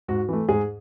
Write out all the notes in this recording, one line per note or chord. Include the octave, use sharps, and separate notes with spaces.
G#2 F#4
E3 A3
G#2 G#4